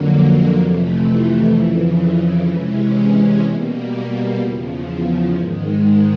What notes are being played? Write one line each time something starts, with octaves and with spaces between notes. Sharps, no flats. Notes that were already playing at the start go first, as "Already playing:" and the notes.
Already playing: F2 D3 F#3 A#3
F2 C3 E3 A3
F2 C#3 E3
C3 E3 G#3 C#4
B2 G3 A#3
E2 C#3 F3
G#2 D#3 G#3